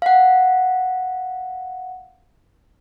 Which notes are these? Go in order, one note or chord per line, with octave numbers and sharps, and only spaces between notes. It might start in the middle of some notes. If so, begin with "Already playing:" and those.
F5 F#5